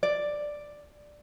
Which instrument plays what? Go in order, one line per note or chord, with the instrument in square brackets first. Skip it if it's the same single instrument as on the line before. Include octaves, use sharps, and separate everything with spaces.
[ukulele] D5